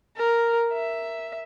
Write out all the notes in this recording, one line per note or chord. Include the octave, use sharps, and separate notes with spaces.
A#4
E5